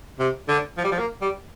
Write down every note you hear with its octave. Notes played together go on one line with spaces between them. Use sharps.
C3
D3
F3
G3
F3
A#3
G3